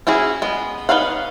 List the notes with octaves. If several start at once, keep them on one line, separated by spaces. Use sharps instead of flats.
C#4 E4 F#4 G#4
G#3 B3
D#4 B4 C#5 F5 F#5